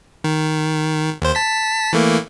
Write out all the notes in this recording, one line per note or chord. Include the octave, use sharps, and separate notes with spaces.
D#3
D#2 C5
A5 B6
E3 A3 A#3